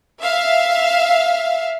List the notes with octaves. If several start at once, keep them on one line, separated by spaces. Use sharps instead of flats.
E5 F5